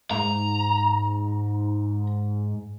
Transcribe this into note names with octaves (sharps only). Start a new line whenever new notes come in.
G#2 A#5